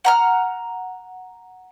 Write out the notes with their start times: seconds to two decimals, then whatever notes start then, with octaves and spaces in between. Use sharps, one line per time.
0.05 F#5 A#5 F6